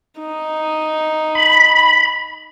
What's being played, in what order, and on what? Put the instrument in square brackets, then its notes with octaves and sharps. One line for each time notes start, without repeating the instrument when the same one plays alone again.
[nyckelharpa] D#4
[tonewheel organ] B5